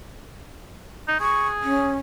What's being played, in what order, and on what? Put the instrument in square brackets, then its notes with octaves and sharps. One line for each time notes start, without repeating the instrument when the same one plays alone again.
[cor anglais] D#4
[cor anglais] G#4 [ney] C#6
[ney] C#4